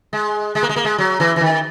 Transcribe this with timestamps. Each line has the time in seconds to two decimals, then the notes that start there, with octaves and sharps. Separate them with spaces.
0.13 G#3
0.55 G#3
0.63 A#3
0.69 G#3
0.76 A#3
0.85 G#3
0.98 F#3
1.20 E3
1.36 E3
1.41 D#3